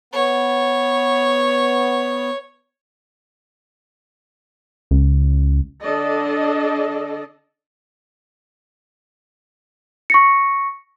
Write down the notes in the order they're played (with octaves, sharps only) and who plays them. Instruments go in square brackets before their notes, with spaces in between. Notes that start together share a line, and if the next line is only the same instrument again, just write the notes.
[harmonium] B3 [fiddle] C#5
[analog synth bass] C#2
[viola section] D3 D4 A4 D5 D#5
[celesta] C#6 A#6 C#7